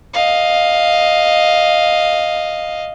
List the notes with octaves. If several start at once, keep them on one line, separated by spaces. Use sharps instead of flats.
D#5 F5